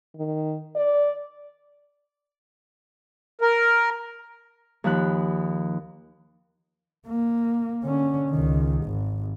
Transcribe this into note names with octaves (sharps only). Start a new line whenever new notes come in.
D#3
D5
A#4
D#2 F3 B5 F#6
A#3
D3 C#4
C#2 D#3
G#1